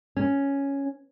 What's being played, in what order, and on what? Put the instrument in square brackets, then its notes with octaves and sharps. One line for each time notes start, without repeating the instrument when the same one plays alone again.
[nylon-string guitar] C#4